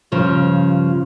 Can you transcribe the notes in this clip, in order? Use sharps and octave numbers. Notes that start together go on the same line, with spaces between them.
G2 C#3 F3